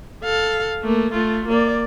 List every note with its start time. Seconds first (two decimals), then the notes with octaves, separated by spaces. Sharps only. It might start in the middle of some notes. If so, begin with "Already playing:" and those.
0.24 A4 F5
0.82 A3 A#3
1.13 A3 F4
1.49 A#3 D5